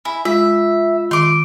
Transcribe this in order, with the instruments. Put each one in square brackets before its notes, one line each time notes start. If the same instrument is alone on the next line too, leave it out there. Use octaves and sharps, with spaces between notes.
[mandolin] E4 [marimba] G#5
[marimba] G#3 [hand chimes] F4 E6 [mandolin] E5
[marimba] D#3 [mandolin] C6 D6